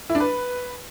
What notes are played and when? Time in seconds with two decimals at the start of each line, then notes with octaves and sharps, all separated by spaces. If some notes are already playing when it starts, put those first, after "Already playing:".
0.10 E4
0.15 D4
0.20 B4